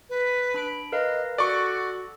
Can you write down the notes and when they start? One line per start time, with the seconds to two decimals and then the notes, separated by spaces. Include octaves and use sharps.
0.10 B4
0.54 D4 B5 D7
0.92 A#4 B4 D#5 F5
1.38 F#4 A4 D5 C#6